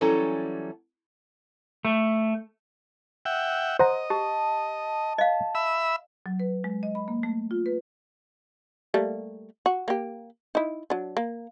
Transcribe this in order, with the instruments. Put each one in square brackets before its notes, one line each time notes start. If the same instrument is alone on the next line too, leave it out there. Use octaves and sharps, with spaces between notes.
[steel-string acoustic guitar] E3 F#3 G3 C#4 A4 A#5
[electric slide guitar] A3
[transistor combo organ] E5 F#5 G5
[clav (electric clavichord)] C5 F#5 A#5 [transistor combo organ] D#5
[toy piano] G4 [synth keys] A5
[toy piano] D#5 F5
[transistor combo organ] E5 B5 E6
[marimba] F#3
B4
G#3
D#5
B5
A#3
A3
F4
B4
[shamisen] G3 A3 A#3
F#4
A#3 G4
D#4 E4
F#3 D4
A#3